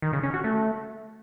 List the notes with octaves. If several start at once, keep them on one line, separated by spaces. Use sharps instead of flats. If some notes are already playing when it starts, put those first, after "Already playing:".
D#3
C#3
C#4
F#4
A3